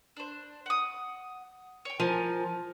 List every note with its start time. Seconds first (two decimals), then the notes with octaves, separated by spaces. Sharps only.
0.17 D4 C5
0.66 F#5 D#6
1.85 C#5 G5
2.00 F3 A#4 G#5 A5